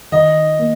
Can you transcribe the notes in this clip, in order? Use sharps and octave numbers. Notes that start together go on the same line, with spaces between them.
D#3 D#5
A#3